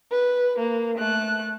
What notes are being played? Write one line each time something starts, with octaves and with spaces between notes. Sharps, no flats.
B4
A#3
A3 F#6